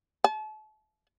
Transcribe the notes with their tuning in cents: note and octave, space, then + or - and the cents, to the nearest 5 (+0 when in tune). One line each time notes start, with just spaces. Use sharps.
A5 -35